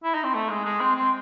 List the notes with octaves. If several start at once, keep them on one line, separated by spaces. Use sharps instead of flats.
E4
D#4
C4
A3
G#3
G#3
C4
C4